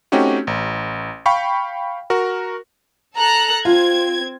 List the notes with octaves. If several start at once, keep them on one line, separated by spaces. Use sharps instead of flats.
A3 C4 C#4 D#4 F#4 G4
A1
F5 G5 B5 C#6
F#4 A#4
A4 A#5 F#6
C4 F4 G#6